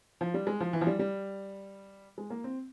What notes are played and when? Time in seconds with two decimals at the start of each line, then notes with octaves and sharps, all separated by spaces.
0.21 F3
0.34 G3
0.47 G#3
0.60 F3
0.73 E3
0.81 F3
0.87 G3
0.99 G3
2.18 G#3
2.30 A#3
2.44 C4